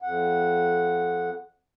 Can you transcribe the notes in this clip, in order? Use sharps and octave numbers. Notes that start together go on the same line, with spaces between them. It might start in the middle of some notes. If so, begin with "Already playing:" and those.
F2 F#5